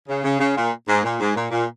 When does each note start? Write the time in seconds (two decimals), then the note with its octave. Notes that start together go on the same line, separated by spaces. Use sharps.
0.08 C#3
0.24 C#3
0.40 C#3
0.56 A#2
0.88 G#2
1.03 A#2
1.20 G#2
1.36 A#2
1.51 A#2